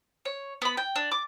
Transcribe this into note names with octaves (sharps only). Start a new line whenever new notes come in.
C#5
B3 B5
G5
D4
D6